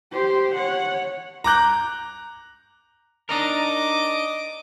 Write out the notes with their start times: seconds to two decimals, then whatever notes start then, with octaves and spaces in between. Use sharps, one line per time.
0.12 G4 C5
0.55 C#5 F#5
1.44 A#5 D6 F#6 G6
3.29 D4 D#4 A#4 D#5 D6